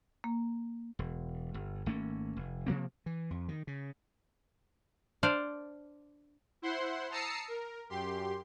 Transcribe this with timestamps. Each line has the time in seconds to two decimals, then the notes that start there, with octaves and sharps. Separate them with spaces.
0.24 A#3
0.99 E1
1.54 G1
1.86 G#1 A3 A#3 C#4
2.36 F1
2.66 C3 F3 A#3 C4
3.06 E3
3.31 F2
3.49 D#3
3.67 C#3
5.23 D4 C5 D5 F5
6.62 E4 C5 F#5 C6
7.11 A5 A#5 D#6 E6 C7 C#7
7.48 A#4
7.90 F#2 G4 C6